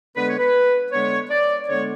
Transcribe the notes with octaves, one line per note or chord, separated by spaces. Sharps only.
D3 G#3 B3 B4
C#5
B4
D3 G#3 B3 C#5
D5
D3 G#3 B3 C#5